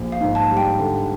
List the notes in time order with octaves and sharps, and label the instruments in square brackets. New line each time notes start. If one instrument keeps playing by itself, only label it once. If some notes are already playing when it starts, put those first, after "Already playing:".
Already playing: [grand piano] A#1
[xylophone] F5
[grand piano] G#2
[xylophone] A5
[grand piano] G3
[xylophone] G5
[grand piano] D3